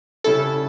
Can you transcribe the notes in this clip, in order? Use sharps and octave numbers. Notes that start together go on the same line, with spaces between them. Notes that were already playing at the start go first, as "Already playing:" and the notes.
C#3 G3 C#4 E4 A4